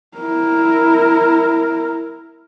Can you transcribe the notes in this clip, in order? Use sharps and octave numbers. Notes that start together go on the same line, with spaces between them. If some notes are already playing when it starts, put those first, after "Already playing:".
E4 A#4